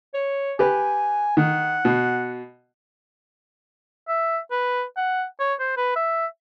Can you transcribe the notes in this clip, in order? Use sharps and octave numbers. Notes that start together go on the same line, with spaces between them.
C#5
G4 B4 G#5
D#3 F#5
B2
E5
B4
F#5
C#5
C5
B4
E5